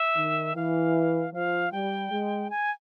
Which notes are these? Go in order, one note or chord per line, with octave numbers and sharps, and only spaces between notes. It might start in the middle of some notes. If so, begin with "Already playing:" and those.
Already playing: E5
D#3
E3 F5
F3 F5
G3 G5
G#3
G#5